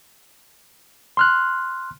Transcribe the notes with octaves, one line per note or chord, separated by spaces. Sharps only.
C6 F6 F#6